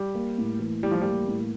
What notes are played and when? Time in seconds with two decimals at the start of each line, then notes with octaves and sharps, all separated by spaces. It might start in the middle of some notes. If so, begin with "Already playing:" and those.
Already playing: G3
0.15 A#3
0.38 A2
0.59 E3
0.82 G3 E4
0.91 F3
1.01 G3 A#3
1.28 A2